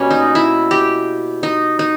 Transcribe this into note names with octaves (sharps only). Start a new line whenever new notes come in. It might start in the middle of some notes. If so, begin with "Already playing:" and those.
Already playing: B2 G3 A#3 C#4
D#4
E4
G4
D#4
D#4